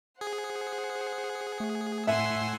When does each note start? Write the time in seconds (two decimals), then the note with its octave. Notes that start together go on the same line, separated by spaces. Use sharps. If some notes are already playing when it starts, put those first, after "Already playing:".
0.21 G#4 C5 F#5
1.60 A3
2.07 A2 E5 F#5 G#5 C6 E6